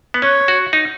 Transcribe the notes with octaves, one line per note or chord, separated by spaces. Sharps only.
B3
C#4 C#5
F#4
D#4